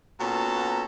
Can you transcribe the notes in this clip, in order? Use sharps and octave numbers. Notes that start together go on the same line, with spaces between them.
A#2 B3 C#4 F#4 A4 A#5